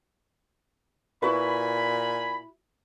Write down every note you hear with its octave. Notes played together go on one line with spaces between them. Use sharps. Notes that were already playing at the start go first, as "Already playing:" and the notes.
A#2 E4 F#4 B4 G#5 B5